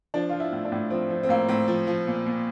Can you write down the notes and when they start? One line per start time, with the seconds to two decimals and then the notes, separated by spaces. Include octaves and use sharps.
0.14 F3 D4
0.29 F3 F4
0.40 E4
0.52 A2
0.65 D4
0.72 A2
0.90 F3 C4
1.10 F3
1.23 C4
1.29 A2 A#3
1.49 A2 C4
1.68 F3
1.87 F3
2.07 A#2
2.26 A#2